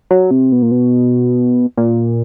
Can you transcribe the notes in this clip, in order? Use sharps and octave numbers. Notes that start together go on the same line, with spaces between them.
F#3
C3
B2
A#2
B2
A#2